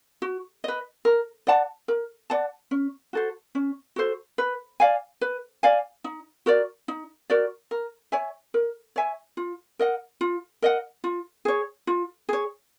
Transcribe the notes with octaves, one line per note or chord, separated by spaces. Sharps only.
F#4
B4 D#5
A#4
D5 F#5 A5
A#4
D5 F#5 A5
C#4
F#4 A4 C5
C#4
F#4 A4 C5
B4
D5 F5 G#5
B4
D5 F5 G#5
D#4
F#4 A#4 D5
D#4
F#4 A#4 D5
A#4
C#5 E5 G#5
A#4
C#5 E5 G#5
F4
A#4 D#5 F#5
F4
A#4 D#5 F#5
F4
G#4 C#5
F4
G#4 C#5